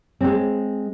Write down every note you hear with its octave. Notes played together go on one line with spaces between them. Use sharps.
G#3 C4